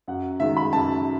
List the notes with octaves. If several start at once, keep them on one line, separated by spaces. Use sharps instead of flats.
F#2 F#5
D#3 G#3 E5
B5
F#2 A5